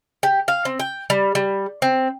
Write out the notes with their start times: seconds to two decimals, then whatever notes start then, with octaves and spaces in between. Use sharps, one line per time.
0.23 G4
0.48 F5
0.65 C4
0.80 G5
1.10 G3
1.35 G3
1.82 C4